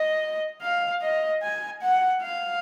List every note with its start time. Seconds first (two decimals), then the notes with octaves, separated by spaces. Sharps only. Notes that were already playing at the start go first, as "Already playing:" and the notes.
Already playing: D#5
0.62 F5
1.02 D#5
1.42 G#5
1.82 F#5
2.22 F5